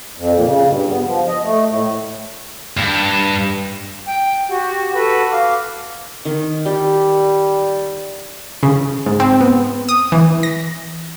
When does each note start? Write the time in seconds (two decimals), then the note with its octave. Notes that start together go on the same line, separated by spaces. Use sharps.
0.17 F2
0.33 A#2
0.44 C#3
0.64 G2
0.89 B3
1.06 F3
1.28 D#5
1.44 A3
1.69 A2
2.77 G2
4.07 G5
4.49 F#4 G4 F#5
4.94 F#4 A4 B4 B5
5.31 F5 D6
6.25 D#3
6.66 G3 G4
8.63 C#3
9.06 G#2
9.20 C4
9.41 B3
9.89 D#6
10.12 E3
10.43 A#6